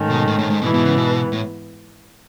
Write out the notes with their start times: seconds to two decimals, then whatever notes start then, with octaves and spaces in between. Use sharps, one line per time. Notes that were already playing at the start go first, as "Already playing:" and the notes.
Already playing: G#2 D#3 A3 C#4
0.10 B2
0.28 A2
0.39 A2
0.50 G#2
0.62 G#2 B2 E3 B3
0.74 B2
0.85 C#3
0.97 B2
1.32 A2